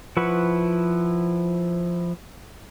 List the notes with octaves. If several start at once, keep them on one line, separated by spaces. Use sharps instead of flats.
F3 E4 B4 F#5 C#6